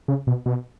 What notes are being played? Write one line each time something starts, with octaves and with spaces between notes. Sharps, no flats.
C#3
B2
B2